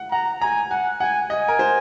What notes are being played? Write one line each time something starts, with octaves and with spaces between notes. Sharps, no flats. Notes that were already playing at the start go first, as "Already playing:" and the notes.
Already playing: F#5
F#5 A#5
G#5 A#5
F#5 G#5
F#5 G#5
D#5 G#5
A#4
C5